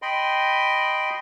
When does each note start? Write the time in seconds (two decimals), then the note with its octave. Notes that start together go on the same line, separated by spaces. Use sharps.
0.02 D#5 G5 B5 C6